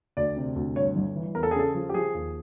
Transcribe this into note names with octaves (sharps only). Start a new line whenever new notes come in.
D2 D5
C3
D2
G2 C#5
G1
E3
E2 A#4
A4
G#4
C#3 A4
F3
G4
F3 G#4
D#2